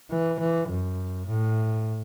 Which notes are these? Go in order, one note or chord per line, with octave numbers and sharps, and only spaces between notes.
E3
E3
F#2
A2